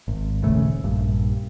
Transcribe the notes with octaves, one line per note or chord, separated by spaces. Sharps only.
G#1
D#1 C#3 A3
A#1 G2